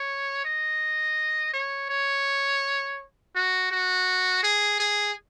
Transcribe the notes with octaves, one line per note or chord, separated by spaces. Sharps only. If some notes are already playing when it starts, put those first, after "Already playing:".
Already playing: C#5
D#5
C#5
C#5
F#4
F#4
G#4
G#4